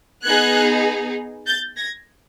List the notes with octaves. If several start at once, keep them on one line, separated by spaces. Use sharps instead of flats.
B3 D#4 G#4 F#6 G#6
G6 A6
G#6 A#6